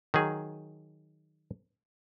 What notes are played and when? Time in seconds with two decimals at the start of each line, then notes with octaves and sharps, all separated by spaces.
0.14 D#3 F#3 G#4